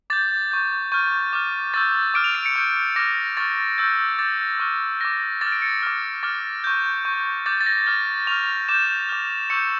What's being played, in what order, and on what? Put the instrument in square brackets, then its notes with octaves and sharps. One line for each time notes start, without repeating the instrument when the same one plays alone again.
[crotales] D6 G6 A6
C#6 G6
C#6 F6 G6
D6 F6
C#6 E6 G6 A6
D6 F6 D7
F7
D7
C#7
C#6 G6
D6 F6 A#6
C#6 F6 A6
C#6 E6 G6 A6
D6 G6 A6
C#6 F6
D6 F6 A#6
D6 F6 A6
D7
C#7
D6 F6
D6 F6 A6
C#6 G6
C#6 G6
D6 G6 A6
A6
A#6
D6 F6 A6
C#6 F6 F7
D6 G6 E7
D6 F6
C#6 E6 G6 C#7